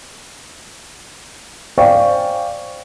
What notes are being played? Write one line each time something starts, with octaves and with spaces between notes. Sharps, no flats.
C5 D5 F5 G5 G#5 C#6